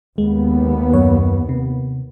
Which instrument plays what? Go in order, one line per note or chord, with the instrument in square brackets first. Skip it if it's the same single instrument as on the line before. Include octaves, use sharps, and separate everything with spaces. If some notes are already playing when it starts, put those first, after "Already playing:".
[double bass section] D#2 B3 [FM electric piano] G#3
[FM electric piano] F#2 C#5
C3